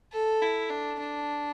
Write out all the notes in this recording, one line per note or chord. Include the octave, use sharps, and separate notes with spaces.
A4
E4
D4
D4